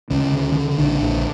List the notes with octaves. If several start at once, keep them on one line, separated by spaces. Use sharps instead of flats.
D2 C#3 C#4
D3
D3
A#1 D3 D4
A#1